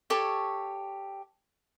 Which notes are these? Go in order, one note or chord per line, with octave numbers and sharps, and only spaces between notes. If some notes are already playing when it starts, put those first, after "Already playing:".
G4 A4 C#5 C#6